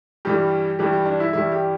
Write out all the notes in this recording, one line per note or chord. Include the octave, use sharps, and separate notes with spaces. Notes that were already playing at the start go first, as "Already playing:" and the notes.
G2 E3 G3 G4
G2 E3 G3 G4
G4
D4
E4
G2 E3 G3 E4
G4